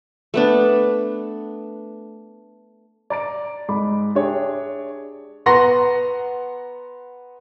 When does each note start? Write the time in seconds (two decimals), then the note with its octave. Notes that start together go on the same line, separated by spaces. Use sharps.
0.34 A3 B3 D4
3.10 D5 A#5 A6 D7
3.68 G#2 G#3 B5 D6
4.15 D4 G4 G#4 C#5 D5 E5
5.46 B3 F#5 A#5 C6 A#6